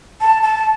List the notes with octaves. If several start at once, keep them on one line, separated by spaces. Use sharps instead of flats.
A5
A5